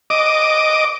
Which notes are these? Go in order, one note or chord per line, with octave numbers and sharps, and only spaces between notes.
D#5 D6